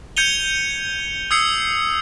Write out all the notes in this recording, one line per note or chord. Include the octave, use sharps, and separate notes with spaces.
G6 G#6 C#7 D#7 F7 G7
D#6 E6 G#6 C7 C#7